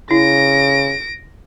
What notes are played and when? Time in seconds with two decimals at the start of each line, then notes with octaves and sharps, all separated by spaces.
0.11 C#3 E4 A#6 D7